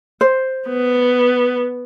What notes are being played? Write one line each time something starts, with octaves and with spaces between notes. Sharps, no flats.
C5
B3